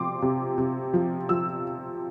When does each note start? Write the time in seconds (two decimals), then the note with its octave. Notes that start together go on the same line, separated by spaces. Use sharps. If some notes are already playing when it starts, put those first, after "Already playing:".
Already playing: C3 F3 C4 G5 C6 D6
0.22 C3
0.58 C3
0.94 F3
1.29 F3 E6